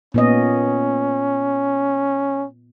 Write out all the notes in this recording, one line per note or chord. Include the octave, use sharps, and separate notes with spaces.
A#2 B3 C#4 D#5